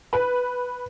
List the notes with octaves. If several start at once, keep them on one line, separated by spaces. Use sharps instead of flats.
B4